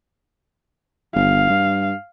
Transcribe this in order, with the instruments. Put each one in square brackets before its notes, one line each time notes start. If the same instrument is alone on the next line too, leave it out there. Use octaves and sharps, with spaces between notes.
[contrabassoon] G1 [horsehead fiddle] F5
[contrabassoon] G2